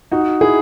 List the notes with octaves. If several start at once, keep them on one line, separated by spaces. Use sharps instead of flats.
D#4 F#4
E4 G#4